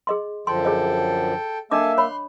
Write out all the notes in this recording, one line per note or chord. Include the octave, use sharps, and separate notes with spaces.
G#4 D#5 C6
F#2 D3 F3 A4 G5 C6
G#4 C#5 D#5
A#3 D4 A4 D#5 E5 G#5 A5 D6
C#5 B5 C6 F#6